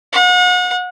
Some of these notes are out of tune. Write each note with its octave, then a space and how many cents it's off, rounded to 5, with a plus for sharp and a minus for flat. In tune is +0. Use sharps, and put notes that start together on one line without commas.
F#5 -35